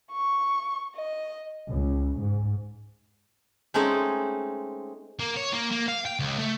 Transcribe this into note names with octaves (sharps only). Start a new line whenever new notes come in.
C#6
D#5
C#2
G#2
G#3 A3 C4 C#4 D#4 G#4
A#3
C#5
A#3
A#3
F5
G5
C#2
A3